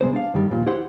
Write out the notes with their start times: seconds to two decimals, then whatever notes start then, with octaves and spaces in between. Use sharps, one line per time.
0.01 C3 G#3 B3 C5
0.13 D4 F5
0.34 G2 D#3 G3
0.50 D#2 A#2 E3 F3
0.66 E4 G4 C5 F#5 C6